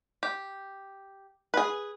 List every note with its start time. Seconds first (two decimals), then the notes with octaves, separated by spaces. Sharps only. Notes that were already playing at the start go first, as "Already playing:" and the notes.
0.23 G4
1.54 G#4 B4